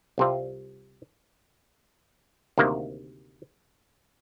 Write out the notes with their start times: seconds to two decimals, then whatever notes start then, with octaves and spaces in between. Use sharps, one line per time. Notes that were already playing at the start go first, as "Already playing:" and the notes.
0.18 C2 C3 G3 C4 F4
2.58 D2 C3 D#3 A#3